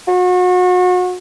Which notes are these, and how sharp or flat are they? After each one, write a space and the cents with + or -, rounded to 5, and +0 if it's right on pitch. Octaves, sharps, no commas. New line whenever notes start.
F#4 -35